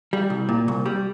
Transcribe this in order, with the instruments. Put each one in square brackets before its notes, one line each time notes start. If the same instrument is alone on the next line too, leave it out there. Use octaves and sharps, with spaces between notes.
[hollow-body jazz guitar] G3
C2
A#2
C2
G3